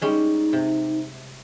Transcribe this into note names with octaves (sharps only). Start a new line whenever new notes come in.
G3 G#3 C#4 D#4
C3